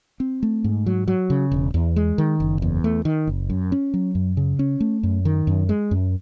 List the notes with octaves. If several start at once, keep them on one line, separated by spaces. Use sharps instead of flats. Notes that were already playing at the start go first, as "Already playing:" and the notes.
C4
A3
G#2
F#3
F#3
C#3
E1
E2
G#3
D#3
F#1
E2
A3
D#3
F#1
F#2
C#4
F#3
F#2
C#3
C#4
A3
F#2
D#3
F#2
G#3
F#2